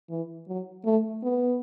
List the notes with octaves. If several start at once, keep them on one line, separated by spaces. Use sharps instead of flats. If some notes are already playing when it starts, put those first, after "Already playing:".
E3
F#3
A3
B3